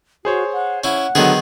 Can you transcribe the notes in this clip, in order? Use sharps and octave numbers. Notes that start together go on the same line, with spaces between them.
F#4 G#4 C5 C#5
F#5
C#4 E4 F#5
D3 D#3 F#3 B3 G#4